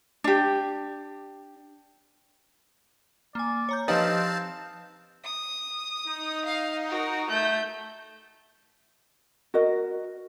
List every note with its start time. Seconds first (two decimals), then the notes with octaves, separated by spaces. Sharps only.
0.24 D4 G4
3.35 A#3 D5 G#5
3.69 C#5 A#5 G6
3.88 F3 C4 D#4 G4 B4 F5 A5
5.24 D#6
6.07 D#4
6.45 F5
6.89 F#4 A#4
7.29 A3 G6
9.54 F#4 A#4 D#5